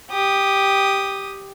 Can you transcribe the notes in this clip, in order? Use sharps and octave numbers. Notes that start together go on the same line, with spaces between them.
G4 D#6